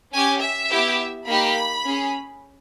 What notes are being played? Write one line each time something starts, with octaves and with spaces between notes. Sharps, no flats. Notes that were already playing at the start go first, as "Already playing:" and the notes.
C#4 G4 G#5
E5
B3 E4 G4
A#3 D#4 G4 B5
C#4 G#4